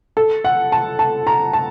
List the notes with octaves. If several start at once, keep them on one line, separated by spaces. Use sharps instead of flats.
A4
F#5
A5
A5
A#5
A5